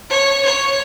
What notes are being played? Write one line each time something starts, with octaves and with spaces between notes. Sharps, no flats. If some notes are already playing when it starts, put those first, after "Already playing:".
C#5
C#5